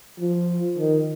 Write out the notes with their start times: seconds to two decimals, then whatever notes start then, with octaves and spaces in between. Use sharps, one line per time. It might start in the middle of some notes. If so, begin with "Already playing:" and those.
0.19 F3
0.78 D#3